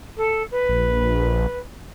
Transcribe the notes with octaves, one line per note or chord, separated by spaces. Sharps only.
A4
B4
A#1